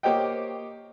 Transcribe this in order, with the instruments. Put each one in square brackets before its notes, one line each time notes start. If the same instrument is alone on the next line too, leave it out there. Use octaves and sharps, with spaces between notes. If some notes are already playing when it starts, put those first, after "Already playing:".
[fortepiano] A#3 G4 C5 C#5 D#5 G5